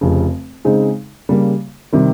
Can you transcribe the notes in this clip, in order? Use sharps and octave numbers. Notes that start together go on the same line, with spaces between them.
F1 F2 C#3
C#3 G#3 C4 D#4 G#4
C#3 G3 A#3
C3 D#3 G3